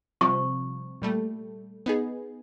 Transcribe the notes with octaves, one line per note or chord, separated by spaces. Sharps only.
C3 F3 G3 C#6
A#2 G3 A3
B3 D#4 G#4